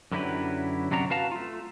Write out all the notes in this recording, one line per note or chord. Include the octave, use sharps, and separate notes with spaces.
F#2 D3 F#3 E4 G4 B4
F#2 C3 F#3 D4 F#4 A#5
F#4 B4 F5 A5 A#5
A3 F4